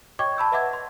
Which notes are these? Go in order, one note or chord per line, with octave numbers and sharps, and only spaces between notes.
C#5 D#5 G5 C#6 D6 G#6
A5 B5 E6 G6
B4 D#5 E5 F#5 D6 G#6
C6